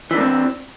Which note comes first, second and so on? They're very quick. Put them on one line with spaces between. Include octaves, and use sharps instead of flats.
E3 D4 A#3 C4